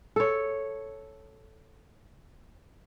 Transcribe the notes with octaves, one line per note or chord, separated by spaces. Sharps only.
A4 C#5